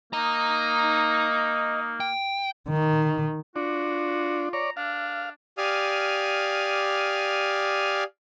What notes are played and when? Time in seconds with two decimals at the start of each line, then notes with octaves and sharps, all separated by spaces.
0.13 A#3 D#4 D#5 A#5
2.00 G5
2.69 D#3
3.56 D4 F4 F#4
4.53 C#5 D5 A#5
4.77 D4 F5
5.58 G4 D5 F5 G#5 D#6 F6